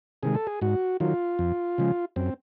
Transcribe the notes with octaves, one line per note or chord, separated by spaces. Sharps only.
C3 D#3 G#3 G#4
A4
G#4
G#2 F#4
D#3 F#3 F4
F2
C#3 F3 G#3
F#2 C4